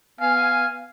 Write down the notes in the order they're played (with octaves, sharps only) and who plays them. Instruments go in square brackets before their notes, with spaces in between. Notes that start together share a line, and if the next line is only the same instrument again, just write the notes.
[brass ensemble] B3 G#5 [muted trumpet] F5